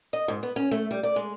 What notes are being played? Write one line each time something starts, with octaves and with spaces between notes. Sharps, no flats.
D#5
G#2
B3
C#4
A3
G3
D5
G#3